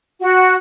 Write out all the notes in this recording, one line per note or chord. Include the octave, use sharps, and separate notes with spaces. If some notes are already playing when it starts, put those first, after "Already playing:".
F#4